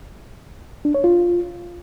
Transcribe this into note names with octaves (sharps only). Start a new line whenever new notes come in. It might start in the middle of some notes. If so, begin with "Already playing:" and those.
D4
C#5
F4